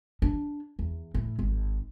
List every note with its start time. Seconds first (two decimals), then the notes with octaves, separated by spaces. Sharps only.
0.22 D4
0.79 E2
1.14 A2
1.39 G#1